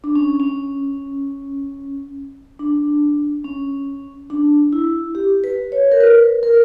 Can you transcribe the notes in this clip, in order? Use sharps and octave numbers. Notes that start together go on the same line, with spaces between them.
D4
C#4
C#4
D4
C#4
D4
E4
G4
B4
C#5
A#4
B4
A#4